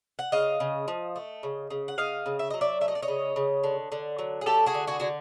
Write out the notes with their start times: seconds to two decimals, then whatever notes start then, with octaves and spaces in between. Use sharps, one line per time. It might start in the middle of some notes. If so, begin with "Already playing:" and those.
0.19 F#5
0.32 C#3 D#5 F5
0.60 C#3
0.88 F3
1.16 A3
1.43 C#3
1.70 C#3
1.88 F#5
1.98 C#3 D#5 F5
2.26 C#3
2.39 E5
2.50 F#3 D#5
2.61 D5 E5
2.81 A3 E5
2.88 D#5
2.95 D5
3.02 C#5 D#5
3.08 C#3
3.36 C#3
3.64 D3
3.92 D3
4.19 F#3
4.41 G#4
4.46 A3 G4 A4
4.66 F#4 G#4
4.74 D3
4.87 F#4 G#4
5.00 D3 F#4